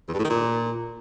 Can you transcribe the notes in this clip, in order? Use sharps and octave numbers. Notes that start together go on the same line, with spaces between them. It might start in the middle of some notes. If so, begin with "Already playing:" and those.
E2
G2
A2
D#3
A#2